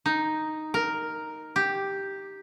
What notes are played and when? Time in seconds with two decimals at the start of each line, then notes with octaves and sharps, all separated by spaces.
0.06 D#4
0.74 A#4
1.56 G4